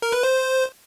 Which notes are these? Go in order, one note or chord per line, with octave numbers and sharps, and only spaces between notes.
A#4
B4
C5